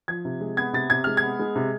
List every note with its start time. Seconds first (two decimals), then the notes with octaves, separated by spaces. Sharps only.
0.08 F3 G#6
0.25 C3
0.41 G#3
0.57 B3 G#6
0.73 C3 A6
0.90 C3 G#6
1.04 G#3 F6
1.17 G#6
1.23 B3
1.39 G#3
1.56 C3